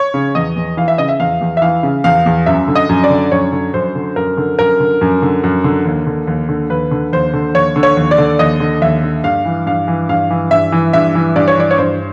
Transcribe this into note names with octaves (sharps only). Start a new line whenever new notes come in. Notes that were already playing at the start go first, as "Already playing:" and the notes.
Already playing: C#5
C#3
E2 D#5
E2
E3 F5
E5
C#3 D#5
E5
E2 F5
E2
E5
E3 F5
C#3
E2 F5
E2
F#2 E5
D3
D#5
F#2
D5
D3
F#2 C#5
D3
F#2 C5
D3
F#2 A#4
D3
F#2 A#4
D3
F#2
D3
F#2
D3
D#2
D3
D#2
D3
D#2 B4
D3
D#2 C5
D3
D#2 C#5
D3
C#5
D#2
D5
D3
D#2 D#5
D3
D#2 E5
D3
G2 F5
E3
G2 F5
E3
G2 F5
E3
G2 E5
E3
G2 E5
E3
G2 D5
C#5
E3 D5
C#5
G2 C5